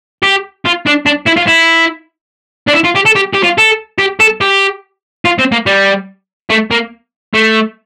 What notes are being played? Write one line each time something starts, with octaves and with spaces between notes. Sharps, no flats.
G4
F4
D4
D4
E4
F4
E4
D4
E4
F4
G4
A4
G4
G4
F4
A4
G4
A4
G4
F4
C4
A#3
G3
A3
A#3
A3